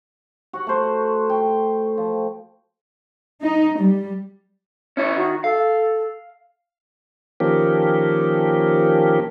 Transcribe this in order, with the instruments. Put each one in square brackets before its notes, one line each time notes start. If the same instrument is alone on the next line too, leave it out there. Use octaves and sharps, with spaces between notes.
[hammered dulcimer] F#4 F#5
A3 C5
G5
F3
[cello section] D#4
G3
[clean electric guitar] C#4 E4 C#5
[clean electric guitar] D#3 [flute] F#4
[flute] A4 [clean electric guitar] F5
[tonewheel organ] D#3 F3 A#3 C#4 G4